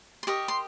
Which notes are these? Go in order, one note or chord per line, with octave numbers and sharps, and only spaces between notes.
C6
G4 A#4 D#5 C#6
C6